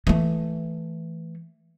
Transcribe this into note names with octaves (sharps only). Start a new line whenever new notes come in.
E3 A3